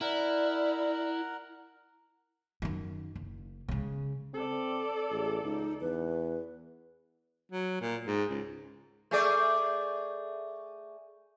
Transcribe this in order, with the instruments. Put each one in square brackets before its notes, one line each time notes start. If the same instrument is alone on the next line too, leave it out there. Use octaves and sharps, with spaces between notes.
[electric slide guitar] E4 [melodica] A#4 F#5 [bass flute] D5
[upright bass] F#2 D#3
F#1
C#3 G#3
[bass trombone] C4 [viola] A4 D5
[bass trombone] A1 [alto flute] G#4
[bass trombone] C#2 [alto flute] D#4
[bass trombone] E2 [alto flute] B4
[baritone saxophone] F#3
A#2
G#2
C#2
[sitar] A3 G#4 D5